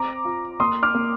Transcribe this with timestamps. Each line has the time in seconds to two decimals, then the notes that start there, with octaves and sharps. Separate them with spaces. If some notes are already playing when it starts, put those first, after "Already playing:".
Already playing: C4 A#5 D6
0.25 F4
0.60 A#3 C6 D#6
0.83 D6 F6
0.95 A#3